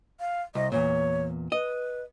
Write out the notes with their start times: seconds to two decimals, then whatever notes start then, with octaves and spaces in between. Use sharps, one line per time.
0.20 F5
0.55 C2 D#5
0.72 E2 G2 A#2 C#5
1.52 B4 D#5